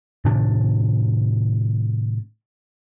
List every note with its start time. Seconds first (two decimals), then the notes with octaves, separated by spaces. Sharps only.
0.25 A2 C3 D#3 D4